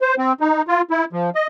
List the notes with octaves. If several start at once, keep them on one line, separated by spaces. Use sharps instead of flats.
C5
C4
D#4
F4
E4
F3
D#5